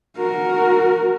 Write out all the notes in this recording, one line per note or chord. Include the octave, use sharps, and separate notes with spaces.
F#4 A#4